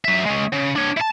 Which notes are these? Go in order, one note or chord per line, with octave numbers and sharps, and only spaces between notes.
F#3 E5
G#3 C#4
C#3
D4 C#5
E4 A5